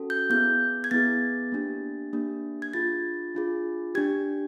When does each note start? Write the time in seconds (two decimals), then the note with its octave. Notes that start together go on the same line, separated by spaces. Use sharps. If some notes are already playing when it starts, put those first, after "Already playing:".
Already playing: C#4 F#4 A4
0.10 G6
0.30 B3 E4 G#4 G6
0.84 G#6
0.91 B3 E4 G#4 A6
1.52 A#3 D4 G4
2.13 A#3 D4 G4
2.62 G#6
2.73 D4 F4 G#4 A6
3.35 D4 F4 G#4
3.95 D4 G4 G#6